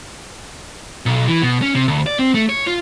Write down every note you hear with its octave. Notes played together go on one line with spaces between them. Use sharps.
B1
E3
B2
C#4
C3
D2
D5
C4
A3
C#5
F4